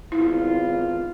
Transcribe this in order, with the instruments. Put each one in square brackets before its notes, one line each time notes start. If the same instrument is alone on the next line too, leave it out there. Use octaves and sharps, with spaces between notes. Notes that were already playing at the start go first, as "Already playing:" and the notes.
[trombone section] G#1 B3 F4 [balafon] E4